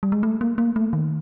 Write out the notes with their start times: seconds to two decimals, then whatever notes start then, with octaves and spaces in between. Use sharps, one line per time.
0.03 G3
0.12 G#3
0.23 A3
0.41 A#3
0.58 A#3
0.76 A3
0.93 D#3